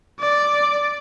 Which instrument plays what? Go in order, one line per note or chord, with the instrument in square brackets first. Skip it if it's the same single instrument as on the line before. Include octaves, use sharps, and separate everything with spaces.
[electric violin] D5